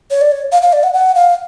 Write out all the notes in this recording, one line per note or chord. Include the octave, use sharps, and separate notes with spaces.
C#5
D5
C#5
F5
F5
D5
F#5
F#5
F5